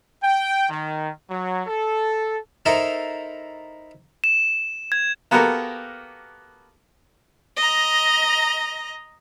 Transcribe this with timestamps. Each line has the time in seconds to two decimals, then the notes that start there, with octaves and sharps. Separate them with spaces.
0.23 G5
0.70 D#3
1.30 F#3
1.67 A4
2.66 D#4 E4 A4 A#4 C5
4.24 E7
4.92 G#6
5.31 A#3 B3 F#4 G4 A4 A#4
7.57 D#5 A#5